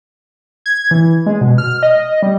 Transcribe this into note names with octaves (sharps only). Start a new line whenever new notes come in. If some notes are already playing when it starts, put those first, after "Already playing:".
G#6
E3
G#3
B2
F6
D#5
G3